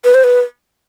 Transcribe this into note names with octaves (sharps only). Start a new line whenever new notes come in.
B4
C5
B4